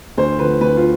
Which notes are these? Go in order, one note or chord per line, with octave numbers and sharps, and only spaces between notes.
D2 C5
D3 F3 B4
D2 B4
F4